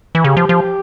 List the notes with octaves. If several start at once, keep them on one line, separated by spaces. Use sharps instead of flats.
E3
C#3 G4
F3
F3